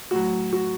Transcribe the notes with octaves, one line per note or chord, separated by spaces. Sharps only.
A2 F#3 F#4
F#4